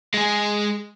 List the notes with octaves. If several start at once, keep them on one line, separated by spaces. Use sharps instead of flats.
G#3 G#4